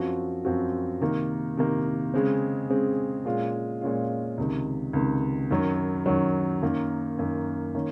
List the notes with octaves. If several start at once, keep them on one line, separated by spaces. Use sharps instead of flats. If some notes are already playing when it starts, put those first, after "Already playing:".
Already playing: F#2 F3 C4 F#4
F#2 F3 C4 F#4
C3 D#3 A#3
C3 D#3 A#3
C#3 G#3 C4
C#3 G#3 C4
A#2 G#3 C#4 F4
A#2 G#3 C#4 F4
C#2 C3 D#3
C#2 C3 D#3
F#2 D#3 F#3
F#2 D#3 F#3
F#2 D#3 A#3
F#2 D#3 A#3
D#3 A#3 C#4